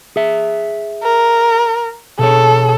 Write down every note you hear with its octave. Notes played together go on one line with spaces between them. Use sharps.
G#4 E5
A#4
B2 G#4 A4 C#5